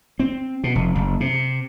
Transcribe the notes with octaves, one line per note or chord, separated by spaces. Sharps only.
C4
B2
F1
F#1
C3